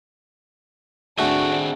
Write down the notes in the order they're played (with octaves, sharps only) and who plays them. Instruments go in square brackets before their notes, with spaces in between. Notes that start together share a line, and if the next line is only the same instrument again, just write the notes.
[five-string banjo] A3 [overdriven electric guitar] C4 G#4 [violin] D4 [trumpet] F#4